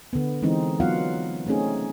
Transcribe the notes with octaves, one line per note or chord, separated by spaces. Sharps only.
D3 B3
E3 G#3 C4 D#4
F#3 B3 D#4 F4 F5 F#5
A3 C4 C#4 D#4 G#4